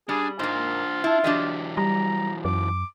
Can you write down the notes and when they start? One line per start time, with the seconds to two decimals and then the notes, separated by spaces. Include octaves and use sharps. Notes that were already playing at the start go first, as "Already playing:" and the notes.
0.09 G3 D4 G#4
0.39 G#2 A#3 D4 F4 C5
1.04 D4 E4 A5
1.24 E3 F#3 D4 G4 D#5
1.77 G3 A#5
2.45 F#2 D6